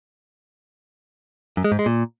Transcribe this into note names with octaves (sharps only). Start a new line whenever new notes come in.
F#2
G#3
G#2
G#3
A#2